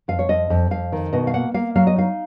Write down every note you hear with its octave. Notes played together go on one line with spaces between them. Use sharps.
F2 F5
C#5
F2 D#5
F2
F2 F5
D#3
B2 D#5
F5
A#3 F#5
A#3 F5
F#3 F5
D#5
D#4 F5